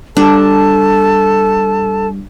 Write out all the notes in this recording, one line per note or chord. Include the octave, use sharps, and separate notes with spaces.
G3 D4 A4 A5